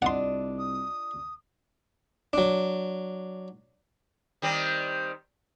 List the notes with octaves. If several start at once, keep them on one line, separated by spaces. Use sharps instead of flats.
C2 D4 F4 D#5 F#5 C6
D#6
F#3 D4
D#3 G3 C4